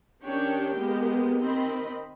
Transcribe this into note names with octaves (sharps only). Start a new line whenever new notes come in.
D#3 C#4 D4 G4 C#5 G5
G#3 A#3 B3 G4 A#4
D#3 C4 D#5 B5